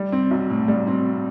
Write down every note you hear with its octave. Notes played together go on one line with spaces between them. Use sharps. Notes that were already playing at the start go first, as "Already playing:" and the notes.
Already playing: G3
C4
B1
A2
G3
C4